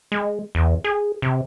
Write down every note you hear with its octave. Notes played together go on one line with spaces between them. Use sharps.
G#3
E2
G#4
C3